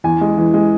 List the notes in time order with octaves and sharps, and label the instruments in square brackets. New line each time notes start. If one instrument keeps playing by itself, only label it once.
[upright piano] E2 G#5
G#3
E3
G#3